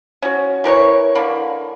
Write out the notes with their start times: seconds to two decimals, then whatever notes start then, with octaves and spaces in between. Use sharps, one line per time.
0.22 C#4 F#4
0.64 E3 A#4 B4 C#5
1.15 D3 E3 A#3 B5